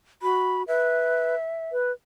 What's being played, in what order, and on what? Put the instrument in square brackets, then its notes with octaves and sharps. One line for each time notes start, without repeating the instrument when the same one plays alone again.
[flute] F#4 [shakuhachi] B5
[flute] B4 [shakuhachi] E5
[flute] B4